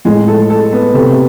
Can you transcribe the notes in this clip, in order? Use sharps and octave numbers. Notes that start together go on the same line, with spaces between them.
A2 G#3
A4
A4
B3
C3 A3